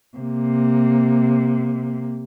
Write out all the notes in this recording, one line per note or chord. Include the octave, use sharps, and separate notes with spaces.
C3 A#3